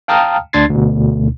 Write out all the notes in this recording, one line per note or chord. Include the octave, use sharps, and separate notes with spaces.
F5 G5 A5 A#5 D#6 F6
D2 D4 C6 G#6 A6 C7
D2 B2